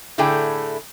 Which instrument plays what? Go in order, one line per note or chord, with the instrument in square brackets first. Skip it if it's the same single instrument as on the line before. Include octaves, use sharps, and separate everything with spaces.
[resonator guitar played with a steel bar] A2 D3 A3 E4 G#4 G5